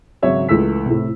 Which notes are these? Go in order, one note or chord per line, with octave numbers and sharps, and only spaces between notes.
G#1 C#3 F#3 C#5 E5
C#2 E3 A3 E6 B6
A2 C3